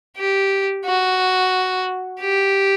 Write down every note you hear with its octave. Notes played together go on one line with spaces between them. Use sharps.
G4
F#4
G4